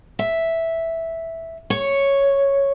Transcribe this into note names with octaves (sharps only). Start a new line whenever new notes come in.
E5
C#5